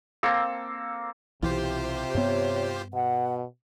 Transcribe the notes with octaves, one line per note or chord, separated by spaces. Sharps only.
A#3 C4 A4 E6
B1 C3 E3 F4 G4 C5
G2 B3 C#5
B2 F#5